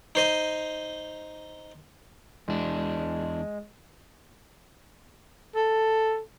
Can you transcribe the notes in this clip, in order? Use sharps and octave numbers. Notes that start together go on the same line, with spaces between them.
D#4 C5 D#5
E2 G#3 D4
A4